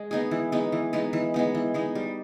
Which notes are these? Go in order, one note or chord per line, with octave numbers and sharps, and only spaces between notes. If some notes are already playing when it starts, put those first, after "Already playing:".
Already playing: G#3
B3 D#4 G#4
E3
G#3 B3 D#4
E3
G#3 B3 D#4
E3
G#3 B3 D#4
E3
G#3 B3 D#4
G3